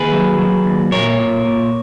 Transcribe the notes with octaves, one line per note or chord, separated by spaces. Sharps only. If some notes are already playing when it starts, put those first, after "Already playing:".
Already playing: D#2 G#4 B4
F#3
F#3
D#2
A#2 A#4 C#5
A#2
A#2